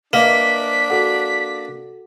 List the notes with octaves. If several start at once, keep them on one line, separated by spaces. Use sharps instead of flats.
A#3 D4 B4 D#5 E5 B6
F#4 A4 F#5